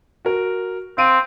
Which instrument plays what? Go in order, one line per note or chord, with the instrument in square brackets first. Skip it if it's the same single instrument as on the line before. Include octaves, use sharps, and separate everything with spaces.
[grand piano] F#4 A#4
[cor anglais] C4 [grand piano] F5 D7 D#7